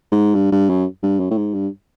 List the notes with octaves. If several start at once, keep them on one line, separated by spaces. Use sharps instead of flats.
G#2
G2
G2
F#2
G2
F#2
A2
G#2
G2